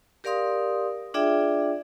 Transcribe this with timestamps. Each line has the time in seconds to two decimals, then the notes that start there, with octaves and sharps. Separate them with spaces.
0.24 G4 A#4 D5 F5 C6 D#6
1.14 D4 F4 G#4 D5 E5 G5